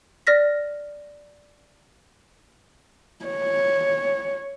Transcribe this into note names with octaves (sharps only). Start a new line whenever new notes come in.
D5 F6 A#6 B6
C#5